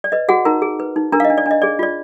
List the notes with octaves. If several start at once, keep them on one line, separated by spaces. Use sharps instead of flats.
D5
B4 D#5
F#4 G#4 F#5
D#4 A#4 A#5
G#4
B4
D#4
D4 A#4 A#5
F5
D#5
D4
D5
D4
D#5
G#4 D5
F4 D5